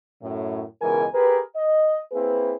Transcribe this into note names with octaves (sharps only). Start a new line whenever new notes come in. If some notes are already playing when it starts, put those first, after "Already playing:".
F#2 A2
C#2 B2 E3 G#3 A#4 G#5
G4 G#4 A#4 B4
D#5
A#3 C4 E4 G#4 B4